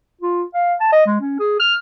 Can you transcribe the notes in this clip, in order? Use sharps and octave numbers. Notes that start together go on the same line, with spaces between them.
F4
F5
A5
D#5
G#3
C#4
G#4
F6